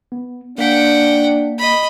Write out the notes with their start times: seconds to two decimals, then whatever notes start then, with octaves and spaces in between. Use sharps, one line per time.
0.12 B3
0.58 A#3 D4 F#5 G5 B6
1.58 D#5 B5